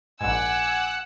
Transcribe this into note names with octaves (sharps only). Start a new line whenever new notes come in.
A#1 G#2 F#5 G#5 D6 E6